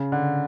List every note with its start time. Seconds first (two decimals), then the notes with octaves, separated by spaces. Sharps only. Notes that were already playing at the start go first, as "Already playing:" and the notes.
Already playing: C#3
0.12 D3